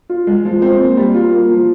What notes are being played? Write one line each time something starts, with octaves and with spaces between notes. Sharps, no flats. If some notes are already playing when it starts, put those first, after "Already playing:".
F4
G#3
F3
C4
A#3
G3
F4
A#3
F3